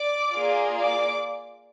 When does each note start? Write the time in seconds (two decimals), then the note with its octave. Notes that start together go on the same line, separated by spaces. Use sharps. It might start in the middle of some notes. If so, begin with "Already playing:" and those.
Already playing: D5 D6
0.35 A#3 F4 G#4
0.79 D5 D6